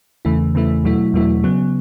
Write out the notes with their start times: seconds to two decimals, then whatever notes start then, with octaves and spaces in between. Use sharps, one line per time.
0.25 E2 C#3 E3 A3 E4
0.55 E2 C#3 E3 A3 E4
0.84 E2 B2 F#3 A3 E4
1.13 E2 B2 F#3 A3 E4
1.44 C#3 F#3 B3